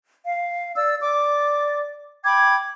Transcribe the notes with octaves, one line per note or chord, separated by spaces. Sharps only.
F5
D5 E6
D5 D6
G5 B5 D6 G#6